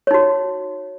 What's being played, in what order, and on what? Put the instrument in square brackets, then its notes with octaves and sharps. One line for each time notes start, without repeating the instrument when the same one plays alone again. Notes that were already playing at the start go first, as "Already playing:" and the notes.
[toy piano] C#5
D#4
F#4